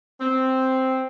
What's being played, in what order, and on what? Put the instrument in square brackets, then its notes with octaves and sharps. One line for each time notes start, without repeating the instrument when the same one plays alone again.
[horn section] C4